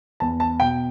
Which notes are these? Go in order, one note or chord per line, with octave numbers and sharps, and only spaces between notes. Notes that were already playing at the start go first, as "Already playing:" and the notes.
E2 A5
A5
B2 G5